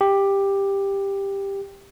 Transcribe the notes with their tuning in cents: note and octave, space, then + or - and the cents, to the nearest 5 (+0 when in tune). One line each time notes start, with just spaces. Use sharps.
G4 +10